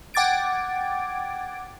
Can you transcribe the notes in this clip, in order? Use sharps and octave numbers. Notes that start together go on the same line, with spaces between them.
F#5 G5 D6 G#6 A6 D7